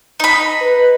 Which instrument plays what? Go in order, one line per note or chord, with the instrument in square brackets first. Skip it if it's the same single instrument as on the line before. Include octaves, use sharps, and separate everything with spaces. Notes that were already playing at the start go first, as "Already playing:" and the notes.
[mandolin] D#4 B5
[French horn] B4